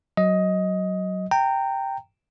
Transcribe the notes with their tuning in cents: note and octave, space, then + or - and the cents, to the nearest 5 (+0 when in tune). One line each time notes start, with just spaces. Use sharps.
F#3 +15 D#5 +15
G5 +0 A#5 -25